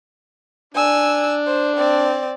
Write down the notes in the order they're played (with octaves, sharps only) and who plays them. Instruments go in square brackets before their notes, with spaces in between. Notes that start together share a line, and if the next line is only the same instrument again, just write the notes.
[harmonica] D4 [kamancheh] G#5 E6
[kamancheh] C5
C4 D5